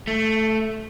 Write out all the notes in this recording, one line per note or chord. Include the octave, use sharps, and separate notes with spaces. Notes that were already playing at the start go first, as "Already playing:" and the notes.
A3